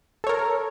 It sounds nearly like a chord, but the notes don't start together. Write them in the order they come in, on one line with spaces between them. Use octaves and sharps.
A4 C#5 A#4